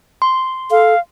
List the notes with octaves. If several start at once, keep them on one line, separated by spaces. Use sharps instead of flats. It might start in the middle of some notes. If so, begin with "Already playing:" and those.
C6
A4 F5